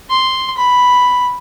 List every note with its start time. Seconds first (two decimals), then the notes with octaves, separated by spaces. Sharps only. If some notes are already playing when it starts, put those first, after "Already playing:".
0.10 C6
0.58 B5